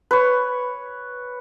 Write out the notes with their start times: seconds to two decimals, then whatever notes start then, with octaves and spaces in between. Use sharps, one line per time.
0.11 B4 C#5